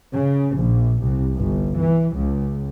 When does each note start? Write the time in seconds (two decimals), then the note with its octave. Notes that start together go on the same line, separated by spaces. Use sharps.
0.12 C#3
0.57 A#1
1.03 C2
1.34 G1
1.78 E3
2.14 C#2